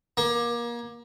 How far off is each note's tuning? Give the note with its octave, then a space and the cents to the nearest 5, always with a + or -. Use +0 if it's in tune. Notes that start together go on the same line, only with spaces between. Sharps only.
A#3 +30